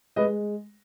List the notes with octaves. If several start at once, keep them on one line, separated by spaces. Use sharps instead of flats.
G#3 B4 D#5